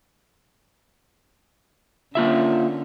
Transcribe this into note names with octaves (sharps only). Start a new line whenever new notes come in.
D3 A#3 C#4 F4 E5